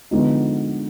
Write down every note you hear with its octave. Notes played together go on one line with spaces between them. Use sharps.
D3 F3 G#3 B3 D#4